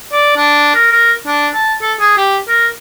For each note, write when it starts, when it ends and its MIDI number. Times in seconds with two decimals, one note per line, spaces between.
0.12 0.36 74
0.37 0.73 62
0.75 0.87 70
0.92 1.13 70
1.26 1.48 62
1.54 1.74 81
1.82 1.93 69
2.00 2.16 68
2.17 2.37 67
2.48 2.67 70